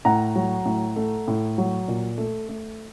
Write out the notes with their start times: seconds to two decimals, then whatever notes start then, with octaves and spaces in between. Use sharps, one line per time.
0.05 A2 F#5 A#5
0.36 F#3
0.65 A2
0.96 A3
1.28 A2
1.58 F#3
1.88 A#2
2.18 A3
2.49 A3